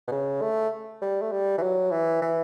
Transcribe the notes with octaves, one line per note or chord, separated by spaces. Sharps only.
B2
C#3
A3
G3
A3
G3
E3
F#3
E3
E3